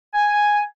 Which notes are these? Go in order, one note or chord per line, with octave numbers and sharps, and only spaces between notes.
G#5